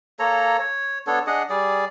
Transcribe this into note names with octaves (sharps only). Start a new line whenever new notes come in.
A#3 A4 C#5 A#5
C#5
B3 D4 A4 C#5
D4 G#4 D#5 F#5
G3 G#4 D5